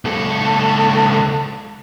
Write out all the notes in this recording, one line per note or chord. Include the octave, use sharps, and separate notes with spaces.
C#2 A4